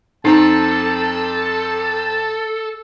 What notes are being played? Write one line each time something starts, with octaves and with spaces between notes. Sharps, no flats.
F2 C4 D#4 A4 A5 A#5